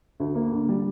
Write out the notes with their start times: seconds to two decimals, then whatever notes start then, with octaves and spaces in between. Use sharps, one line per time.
0.20 D2
0.35 A#3
0.52 D3
0.69 G3